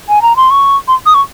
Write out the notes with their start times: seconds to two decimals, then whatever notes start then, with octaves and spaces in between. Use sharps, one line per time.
0.09 G#5
0.22 A#5
0.36 C6
0.50 C#6
0.88 C6
1.06 D#6
1.14 C#6